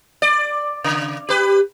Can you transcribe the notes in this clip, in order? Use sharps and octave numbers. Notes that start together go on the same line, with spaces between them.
D5
C#3
G4 B4